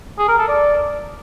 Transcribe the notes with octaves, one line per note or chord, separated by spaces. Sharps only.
G#4
A#4
A4
D5